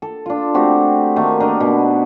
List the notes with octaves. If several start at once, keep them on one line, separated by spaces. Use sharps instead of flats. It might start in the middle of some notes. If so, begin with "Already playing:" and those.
A4
D4 F4
A3 C4 F#4 G4
D#3 A3 A#3
D4 D#4 A#4 D#5
B2